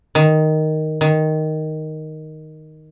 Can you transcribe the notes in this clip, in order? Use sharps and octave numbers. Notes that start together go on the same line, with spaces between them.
D#3
D#3